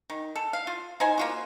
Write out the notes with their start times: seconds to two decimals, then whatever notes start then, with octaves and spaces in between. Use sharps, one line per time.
0.10 D#3
0.36 A4
0.53 F5
0.67 F4
1.00 D#4 C5 G#5
1.18 A#3 F4 F#4